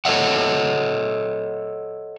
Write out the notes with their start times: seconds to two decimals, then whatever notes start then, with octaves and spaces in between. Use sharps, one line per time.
0.05 A4 C#5 D#5 E5 F#5